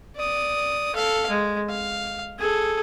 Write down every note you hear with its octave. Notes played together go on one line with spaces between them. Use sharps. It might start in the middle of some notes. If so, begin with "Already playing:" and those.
D5 D#6
A4 F5
G#3
F5
G#4 A4